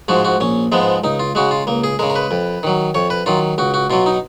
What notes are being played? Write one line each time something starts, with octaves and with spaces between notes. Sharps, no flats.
G#2 F3 G#3 F#4
F#4
A#1 C#4
G#2 F3 G#3 B3
C#2 D#4
F4
C#3 G#3 F#4
F4
C#2 A#3
G#4
C#3 G#3 A#4
A#4
B4
F2
D#3 F#3
F2 C#5
B4
D#3 F#3 F4
C#2 F#4
F#4
B2 F#3 F4
D#4